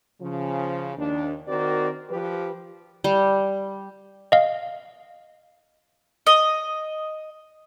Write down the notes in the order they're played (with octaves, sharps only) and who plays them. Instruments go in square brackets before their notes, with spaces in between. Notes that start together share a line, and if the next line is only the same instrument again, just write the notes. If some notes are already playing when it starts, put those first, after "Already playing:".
[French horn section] C#3 F3
D#2 D4
D#3 C4 F#4 A#4 D5
F3 G4 B4
[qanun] G3
[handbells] D#5 F5
[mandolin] D#5